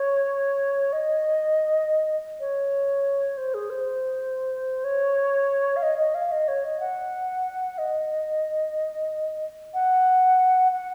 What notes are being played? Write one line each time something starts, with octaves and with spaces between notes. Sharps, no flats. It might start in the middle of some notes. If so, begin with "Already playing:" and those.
Already playing: C#5
D#5
C#5
C5
G#4
C5
C#5
F5
D#5
D#5
F5
D#5
C#5
D#5
F#5
D#5
F#5
F#5